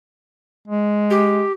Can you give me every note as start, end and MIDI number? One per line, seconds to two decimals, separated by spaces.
0.68 1.44 56
1.10 1.52 67